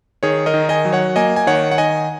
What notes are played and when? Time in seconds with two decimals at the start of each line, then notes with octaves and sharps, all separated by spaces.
0.23 D#3 G#4 C#5
0.46 A#4 D#5
0.54 D#3
0.69 D#5 G#5
0.85 F#3
0.92 C#5 F#5
1.16 A#3 D#5 G#5
1.36 G#5
1.47 D#3 C#5 F#5
1.71 F#5
1.78 D#3 D#5 G#5